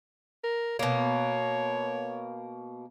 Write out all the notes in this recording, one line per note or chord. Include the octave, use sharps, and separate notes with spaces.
A#4
B2 A#3 C#5